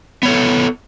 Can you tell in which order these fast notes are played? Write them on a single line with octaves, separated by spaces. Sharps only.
B3 C#5 A4